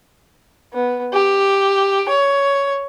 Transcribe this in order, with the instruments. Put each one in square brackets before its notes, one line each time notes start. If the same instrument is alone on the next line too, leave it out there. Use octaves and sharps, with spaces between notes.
[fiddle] B3
G4
C#5